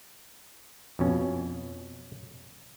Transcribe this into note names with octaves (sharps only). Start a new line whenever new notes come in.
F2 B2 C#4